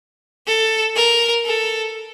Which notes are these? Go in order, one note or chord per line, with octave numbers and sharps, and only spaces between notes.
A4
A#4
A4